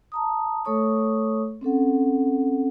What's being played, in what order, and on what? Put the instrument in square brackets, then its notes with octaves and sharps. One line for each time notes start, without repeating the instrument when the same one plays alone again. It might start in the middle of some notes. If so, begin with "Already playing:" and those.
[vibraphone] A5 A#5 D#6
A3 A4 C#5 C#6 D#6
C4 C#4 A4 F#5